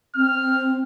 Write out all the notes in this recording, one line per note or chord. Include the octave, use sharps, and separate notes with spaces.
C4 F6